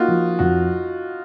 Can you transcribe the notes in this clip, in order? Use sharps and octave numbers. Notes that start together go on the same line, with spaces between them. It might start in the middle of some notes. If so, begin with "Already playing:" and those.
Already playing: A#3 D#4 F4 F#4
F3
F2 F#4